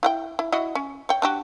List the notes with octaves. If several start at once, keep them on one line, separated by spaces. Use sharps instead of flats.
E4 F#5 G5
E4
E4 F#4 D#5
C#4
C#5 G5
D4 F#4 G4